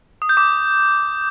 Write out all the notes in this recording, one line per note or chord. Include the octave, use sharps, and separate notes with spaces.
D#6
G6
D6